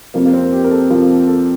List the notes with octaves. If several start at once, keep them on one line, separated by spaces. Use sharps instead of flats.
F2 C3 F3 A#3
A#3
C4
G4
A#4
A4
F2 C3 F3 A#4
A4